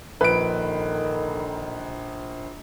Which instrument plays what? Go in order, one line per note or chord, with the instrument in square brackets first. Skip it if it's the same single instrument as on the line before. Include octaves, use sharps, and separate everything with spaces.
[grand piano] A#1 D7 [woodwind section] D3 D#3 [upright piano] B4